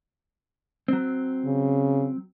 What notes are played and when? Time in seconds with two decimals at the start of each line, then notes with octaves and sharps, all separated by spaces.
0.88 F#3 C4
1.45 C#3